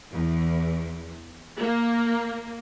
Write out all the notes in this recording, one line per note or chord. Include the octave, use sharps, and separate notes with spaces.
E2
A#3